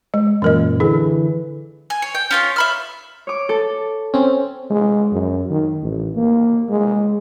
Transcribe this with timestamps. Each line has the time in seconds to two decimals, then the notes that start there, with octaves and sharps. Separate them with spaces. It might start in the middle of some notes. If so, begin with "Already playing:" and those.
0.14 G#3
0.42 F#2 A#2 E3 A#4 D#5
0.80 D3 E3 E4 G#4
1.90 G#5
2.02 C#5
2.15 G5
2.31 C#4 F4 C#5
2.56 E5 B5 F6
3.27 C#5 D6
3.49 A4
4.14 C4 C#4
4.70 G#3
5.12 F#2
5.50 D#3
5.83 A1
6.15 A#3
6.70 G#3